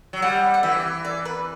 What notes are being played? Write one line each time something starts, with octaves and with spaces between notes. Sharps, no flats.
F#3
G3 F#5
F#5
E3 E5
D5
B4